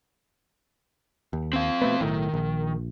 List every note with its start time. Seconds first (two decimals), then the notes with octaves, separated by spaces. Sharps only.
1.33 D#2
1.53 C4 F5
1.82 B2 A3 B3
2.01 B1 A2 D#3
2.34 A#1